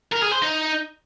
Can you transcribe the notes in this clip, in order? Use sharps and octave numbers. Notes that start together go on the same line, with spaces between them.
A#4
G#4
C5
D#4